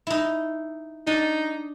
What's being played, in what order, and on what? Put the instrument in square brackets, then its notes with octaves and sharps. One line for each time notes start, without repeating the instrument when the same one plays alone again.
[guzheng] D#4 E4
[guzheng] D4 [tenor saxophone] D#4